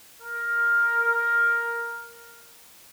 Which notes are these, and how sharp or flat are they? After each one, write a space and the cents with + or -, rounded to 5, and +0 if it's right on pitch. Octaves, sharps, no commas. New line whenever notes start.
A#4 +5